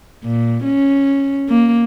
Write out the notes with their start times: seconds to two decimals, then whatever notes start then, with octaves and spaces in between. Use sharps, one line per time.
0.24 A#2
0.64 C#4
1.49 A#3